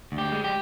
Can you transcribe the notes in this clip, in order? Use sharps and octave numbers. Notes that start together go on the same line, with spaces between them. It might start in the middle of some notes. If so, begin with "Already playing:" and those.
D2
G4
G#3
G4